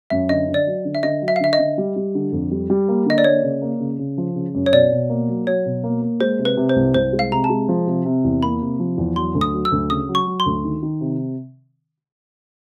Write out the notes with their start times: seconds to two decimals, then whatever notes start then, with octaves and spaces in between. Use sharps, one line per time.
0.10 F#2 E5
0.29 D3 D#5
0.48 D3
0.54 D5
0.67 F#3
0.85 D3
0.95 E5
1.03 D3 D#5
1.22 F#3
1.28 E5
1.36 F5
1.40 D3 E5
1.53 D#5
1.59 D3
1.78 G3
1.96 G3
2.15 D3
2.32 F2
2.51 G3
2.70 G3
2.88 A#3
3.06 D3 D#5
3.18 D5
3.24 A#3 C#5
3.44 C#3
3.62 A#3
3.80 C#3
3.99 C#3
4.18 F3
4.35 C#3
4.54 F#2
4.66 C#5
4.72 B2 D5
4.92 B2
5.10 A#3
5.28 F#3
5.47 F#3 C#5
5.66 B2
5.84 A#3
6.02 A#3
6.20 G#3 C5
6.39 C3
6.45 B4
6.57 C3
6.69 C5
6.76 C2
6.94 C2 C5
7.13 G#3
7.19 F5
7.31 C3 A#5
7.44 A5
7.50 G#3
7.69 F3
7.87 C3
8.05 C3
8.24 E2
8.43 A#3 B5
8.61 C3
8.80 F3
8.98 E2
9.16 F#3 C6
9.35 D2
9.41 D#6
9.53 F#3
9.65 E6
9.72 D2
9.90 C#3 D#6
10.09 F#3
10.15 C#6
10.27 F#3
10.40 C6
10.46 D2
10.64 D#3
10.83 D#3
11.01 C3